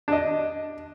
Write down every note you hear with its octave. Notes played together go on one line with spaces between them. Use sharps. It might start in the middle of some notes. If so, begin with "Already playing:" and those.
D4 D#5